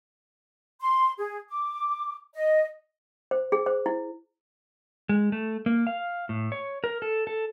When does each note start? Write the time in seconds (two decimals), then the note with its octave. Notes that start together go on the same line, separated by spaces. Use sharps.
0.80 C6
1.18 G#4
1.49 D6
2.34 D#5
3.31 C5
3.52 G#4
3.66 C5
3.86 E4
5.09 G#3
5.32 A3
5.66 A#3
5.87 F5
6.29 A2
6.52 C#5
6.84 A#4
7.02 A4
7.27 A4